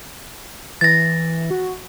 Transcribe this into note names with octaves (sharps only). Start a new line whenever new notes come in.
E3 A6 A#6
F#4